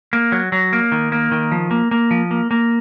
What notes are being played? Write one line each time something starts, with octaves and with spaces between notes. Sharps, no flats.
A#3
F#3
F#3
A#3
D#3
A#3
D#3
F3
A#3
A#3
F3
A#3
A#3